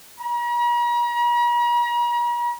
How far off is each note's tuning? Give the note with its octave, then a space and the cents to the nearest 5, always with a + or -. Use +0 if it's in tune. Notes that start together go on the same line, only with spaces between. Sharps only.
A#5 +45